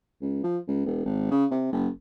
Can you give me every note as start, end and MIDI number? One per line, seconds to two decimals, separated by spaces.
0.21 0.41 37
0.44 0.58 53
0.68 0.85 37
0.85 1.03 28
1.05 1.29 32
1.31 1.45 49
1.51 1.70 48
1.72 1.88 30